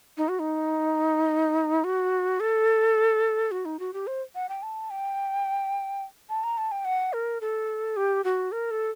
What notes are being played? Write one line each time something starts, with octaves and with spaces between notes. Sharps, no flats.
D#4
F#4
D#4
F#4
A4
F#4
D#4
F#4
G4
C5
F#5
G5
A5
G5
A5
A#5
A5
G5
F#5
A#4
A4
G4
F#4
A#4
A4